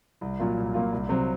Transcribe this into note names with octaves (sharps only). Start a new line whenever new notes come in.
C2
A#2 F#3 A#3 F4
C2
A#2 F#3 A#3 F4
C2
C3 F#3 C4